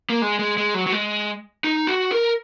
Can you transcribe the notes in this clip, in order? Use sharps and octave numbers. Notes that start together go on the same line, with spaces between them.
A#3
G#3
G#3
G#3
F#3
F#3
G#3
D#4
F#4
A#4